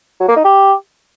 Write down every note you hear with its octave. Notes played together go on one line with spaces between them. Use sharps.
F#3
A#3
D#4
G4